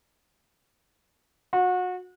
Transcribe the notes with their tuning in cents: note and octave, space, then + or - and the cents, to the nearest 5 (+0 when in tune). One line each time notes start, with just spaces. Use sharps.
F#4 -30